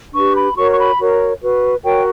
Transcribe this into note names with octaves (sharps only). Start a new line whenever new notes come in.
D4 G4 B4 C#6
B5
F#4 A#4 C#5 C#6
C#6
B5
F#4 A#4 C#5
F#4 B4
F#4 A#4 C#5 G5